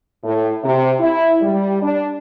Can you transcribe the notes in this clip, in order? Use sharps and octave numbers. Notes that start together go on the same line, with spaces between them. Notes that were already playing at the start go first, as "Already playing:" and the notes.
A2
C3
E4
G3
D4